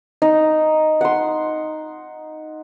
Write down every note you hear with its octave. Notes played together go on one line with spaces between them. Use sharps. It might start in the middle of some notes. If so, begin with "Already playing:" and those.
D#4
F#5 C6